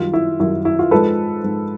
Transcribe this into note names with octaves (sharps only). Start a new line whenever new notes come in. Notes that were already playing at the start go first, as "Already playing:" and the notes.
Already playing: F#2 D#3 G3 F4
E4
F#2 D#3 G3 E4
E4
F4
G#2 F3 G#3 A4 B4
G#2 F3 G#3